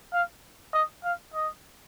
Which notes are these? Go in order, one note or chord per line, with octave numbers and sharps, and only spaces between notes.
F5
D#5
F5
D#5